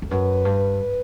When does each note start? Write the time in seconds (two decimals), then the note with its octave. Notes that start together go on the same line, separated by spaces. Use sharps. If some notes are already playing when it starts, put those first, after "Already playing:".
0.02 F2
0.10 F#2 B4
0.45 G2